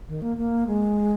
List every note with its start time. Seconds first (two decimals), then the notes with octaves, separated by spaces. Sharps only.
0.08 D#3
0.22 A#3
0.37 A#3
0.67 G#3